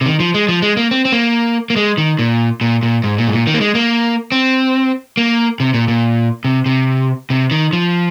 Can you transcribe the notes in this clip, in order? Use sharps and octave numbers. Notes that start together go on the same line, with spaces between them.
C3
D#3
F3
G#3
F3
G#3
A#3
C4
C4
A#3
A#3
G#3
D#3
A#2
A#2
A#2
G#2
A#2
G#2
A#2
D#3
A#3
G#3
A#3
C4
A#3
C3
A#2
A#2
C3
C3
C3
D#3
F3